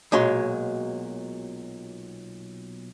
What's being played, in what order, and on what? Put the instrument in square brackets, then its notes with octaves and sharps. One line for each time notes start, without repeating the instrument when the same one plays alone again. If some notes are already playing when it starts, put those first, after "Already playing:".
[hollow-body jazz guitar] B1 A#2 F#3 G#3 C#5 C6